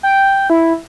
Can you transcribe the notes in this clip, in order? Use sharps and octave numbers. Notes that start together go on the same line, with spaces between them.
G5
E4